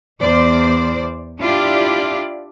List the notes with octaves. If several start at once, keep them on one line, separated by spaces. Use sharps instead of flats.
E2 C5 D5
D4 E4 F4 G4 D5